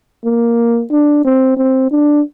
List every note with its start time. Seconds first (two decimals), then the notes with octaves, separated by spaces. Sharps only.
0.25 A#3
0.90 D4
1.25 C4
1.57 C4
1.91 D4